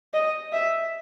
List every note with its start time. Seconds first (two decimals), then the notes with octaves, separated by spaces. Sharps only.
0.14 D#5
0.53 E5